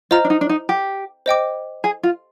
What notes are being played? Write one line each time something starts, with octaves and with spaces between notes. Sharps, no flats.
F4 C5 D#5 A#5 F6
D4
D#4
D4
D#4
G4
C5 D#5 G5 D6
G#4
F4